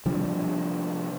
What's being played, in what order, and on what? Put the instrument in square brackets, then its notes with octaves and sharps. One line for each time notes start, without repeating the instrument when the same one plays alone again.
[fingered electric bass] C3 F3 G3 D4